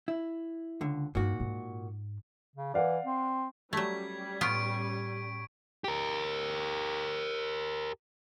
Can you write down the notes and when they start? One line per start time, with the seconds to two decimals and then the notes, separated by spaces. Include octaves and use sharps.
0.08 E4
0.81 C#2 D3
1.15 G2 A#2 D#4 F#4
1.40 G#2
2.56 C#3
2.74 E3 D5 F5 F#5
3.05 C4
3.73 F#3 G3 A3 C#4 G#6 B6
4.41 A2 B3 F4 C#6 D7
5.84 G4 A#4